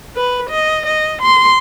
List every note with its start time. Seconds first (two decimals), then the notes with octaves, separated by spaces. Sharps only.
0.16 B4
0.50 D#5
0.86 D#5
1.22 C6